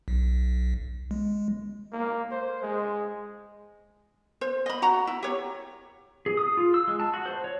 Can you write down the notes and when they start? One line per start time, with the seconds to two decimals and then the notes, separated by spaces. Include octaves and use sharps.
0.08 B1
1.11 G#3
1.92 A#3
2.31 C5
2.62 G#3
4.41 C5
4.66 D#5 B5
4.82 F#4 F#5 A#5
5.07 E4
5.23 G4 C#5
6.26 G#4
6.37 D#6
6.57 F4
6.74 E6
6.88 G#3
7.00 A5
7.13 F#4
7.26 C5
7.44 C#5